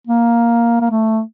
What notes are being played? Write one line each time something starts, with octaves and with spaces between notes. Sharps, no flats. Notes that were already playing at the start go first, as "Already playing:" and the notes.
A#3
A#3
A3